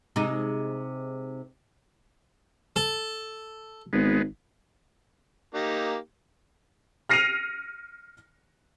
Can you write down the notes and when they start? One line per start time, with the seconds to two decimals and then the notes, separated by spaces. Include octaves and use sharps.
0.16 C3 G#3 D#4
2.76 A4
3.93 G#1 G#3 B3
5.55 A#3 D#4 G4
7.09 F6 A#6 C7 C#7 D#7 F7